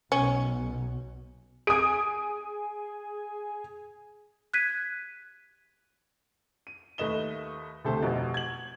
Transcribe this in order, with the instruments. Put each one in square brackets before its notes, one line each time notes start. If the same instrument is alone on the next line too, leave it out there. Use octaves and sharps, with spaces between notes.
[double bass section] B1 B2 [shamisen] C#4
[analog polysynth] G#4 G#5 [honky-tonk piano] D#6 D7
[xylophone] F#6 G#6 B6 D#7
[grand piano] D#7
D#2 A3 B4 D#5 E7 G7
D2 C3 A3 A4 C5
F1 B2
G#6 F#7